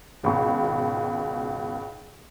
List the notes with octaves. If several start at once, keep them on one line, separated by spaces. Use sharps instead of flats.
G#1 C#2 B2 C#6